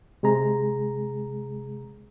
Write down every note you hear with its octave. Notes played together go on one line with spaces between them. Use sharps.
C3 G#3 G#4 A#5